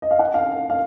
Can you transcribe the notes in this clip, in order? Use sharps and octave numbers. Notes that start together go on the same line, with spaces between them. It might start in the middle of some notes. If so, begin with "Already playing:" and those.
D#5
F5
F#5
F5
F5